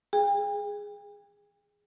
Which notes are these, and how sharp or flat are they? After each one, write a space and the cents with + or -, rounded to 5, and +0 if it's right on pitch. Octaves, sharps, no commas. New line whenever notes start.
G#4 +0 G5 +40